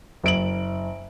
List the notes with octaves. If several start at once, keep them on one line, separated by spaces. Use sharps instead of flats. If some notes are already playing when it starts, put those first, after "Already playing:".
F#1 D7 F#7